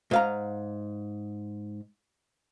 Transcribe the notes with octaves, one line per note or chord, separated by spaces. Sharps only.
G#2 F5 A#5